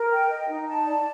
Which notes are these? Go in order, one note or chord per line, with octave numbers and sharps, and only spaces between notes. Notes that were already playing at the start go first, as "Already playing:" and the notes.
Already playing: A#4
G5
D#5
D#4
A5
D5